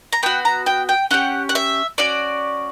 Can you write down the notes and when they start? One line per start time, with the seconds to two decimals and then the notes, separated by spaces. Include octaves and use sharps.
0.13 A#5
0.23 B3 F#4 G5
0.45 A#5
0.66 G5
0.89 G5
1.11 C#4 E4 G4 F#5
1.49 F#5
1.55 E5
1.98 C#4 F#4 D5